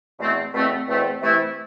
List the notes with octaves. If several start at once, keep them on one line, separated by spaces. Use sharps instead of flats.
E2 B2 A3 C4
E2 B2 A3 C4
E2 B2 A3 C4
C3 E3 A3 E4